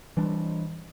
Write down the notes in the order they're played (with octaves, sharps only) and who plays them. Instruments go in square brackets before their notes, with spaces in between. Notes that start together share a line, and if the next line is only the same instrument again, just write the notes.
[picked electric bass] E3 G3 D4